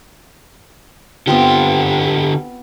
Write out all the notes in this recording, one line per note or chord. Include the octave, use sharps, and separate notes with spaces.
D3 B3 C4 F4 G4